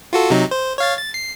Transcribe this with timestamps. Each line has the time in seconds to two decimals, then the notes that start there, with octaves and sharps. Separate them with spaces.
0.13 F4 F#4 A4
0.30 C3 F#3 D#4
0.51 C5
0.78 C#5 F5 A6
0.98 A6
1.14 C7